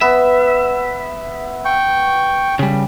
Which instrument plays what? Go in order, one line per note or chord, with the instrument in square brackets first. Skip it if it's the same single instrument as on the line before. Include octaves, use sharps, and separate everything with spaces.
[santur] B3 B4 [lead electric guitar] E5
[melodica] G5 C#6
[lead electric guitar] C#3 G3